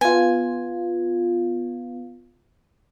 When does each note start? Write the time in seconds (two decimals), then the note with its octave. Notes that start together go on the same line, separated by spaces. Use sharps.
0.01 B3 F4 G#5